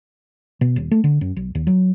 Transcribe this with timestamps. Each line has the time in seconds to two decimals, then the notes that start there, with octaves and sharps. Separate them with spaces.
0.61 B2
0.76 D#1
0.91 A3
1.04 D3
1.21 F#2
1.36 B1
1.55 D#2
1.67 F#3